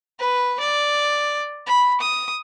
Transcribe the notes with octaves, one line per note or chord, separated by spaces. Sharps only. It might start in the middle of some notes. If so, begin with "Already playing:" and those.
B4
D5
B5
D#6